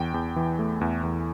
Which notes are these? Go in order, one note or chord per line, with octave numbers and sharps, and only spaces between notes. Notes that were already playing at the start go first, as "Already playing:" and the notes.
Already playing: E2 G5
E2
E3
A3
E2
E2